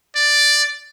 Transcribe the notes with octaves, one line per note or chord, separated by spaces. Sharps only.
D5